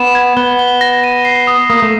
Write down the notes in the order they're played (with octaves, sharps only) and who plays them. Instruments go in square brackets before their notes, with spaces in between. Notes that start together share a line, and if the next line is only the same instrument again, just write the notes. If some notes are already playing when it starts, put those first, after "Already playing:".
Already playing: [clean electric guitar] B3 [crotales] E7
[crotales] G#6
[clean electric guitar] B3 [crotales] G7
[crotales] G7
A#6
D#7
C7
D#6
[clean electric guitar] A#3 [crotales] D#6
[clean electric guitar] A3